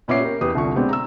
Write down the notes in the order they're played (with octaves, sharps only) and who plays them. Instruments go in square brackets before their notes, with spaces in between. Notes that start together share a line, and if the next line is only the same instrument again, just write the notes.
[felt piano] A#2 B3 C#4 E5 D6 C7
G4 A#4
E2 G4 B4 D#6
C2 D3 F3 C#6
B2 G#3 B3 C4 D4 G4
A#5 E6